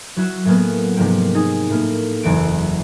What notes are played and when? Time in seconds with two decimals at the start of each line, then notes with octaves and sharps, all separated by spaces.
0.16 F#3 E4 F#4 E7
0.45 A2 F#3 G#3 A#3 B3
0.97 G#2 C3 F3 A#3 G5
1.35 D#4 G#4 A#6
1.70 A2 A#3
2.23 F#1 E2 E3 B3 D7